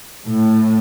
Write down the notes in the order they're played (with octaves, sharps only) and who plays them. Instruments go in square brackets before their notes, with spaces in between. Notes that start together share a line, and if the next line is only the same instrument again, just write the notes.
[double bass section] A2